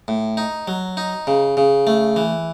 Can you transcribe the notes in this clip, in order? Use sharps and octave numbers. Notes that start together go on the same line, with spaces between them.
A2
D#4
F#3
D#4
C#3
C#3
A3
E3